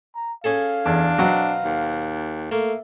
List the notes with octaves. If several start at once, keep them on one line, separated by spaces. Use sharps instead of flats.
A#5
C#4 G#4 A4 F5
E2 D4
B2 F#3 C4
D#2
A3 A#3 E5